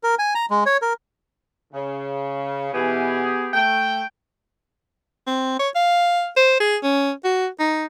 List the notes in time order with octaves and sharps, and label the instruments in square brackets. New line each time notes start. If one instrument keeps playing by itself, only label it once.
[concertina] A#4
G#5
A#5
G#3
C#5
A#4
[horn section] C#3
[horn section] B2 E3 [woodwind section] B3 G4 G#4
[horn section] A3 G5
[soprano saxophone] C4
C#5
F5
C5
G#4
C#4
F#4
D#4